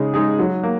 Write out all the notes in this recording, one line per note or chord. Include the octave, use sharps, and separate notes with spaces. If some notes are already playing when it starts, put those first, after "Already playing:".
Already playing: C#3 G#3 D#4 G#4
G#3 D#4 G#4
F#3
A#3